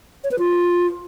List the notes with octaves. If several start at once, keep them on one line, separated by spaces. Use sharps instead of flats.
C#5
B4
F4